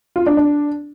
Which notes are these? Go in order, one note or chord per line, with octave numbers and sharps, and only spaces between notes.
F4
D4
D4